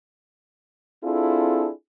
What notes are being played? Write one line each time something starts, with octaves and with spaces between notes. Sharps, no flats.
C4 D4 E4 F4 G#4 A4